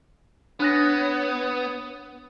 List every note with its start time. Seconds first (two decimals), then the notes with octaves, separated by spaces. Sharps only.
0.60 B3 D4 C#5 D#6 F#6 A#6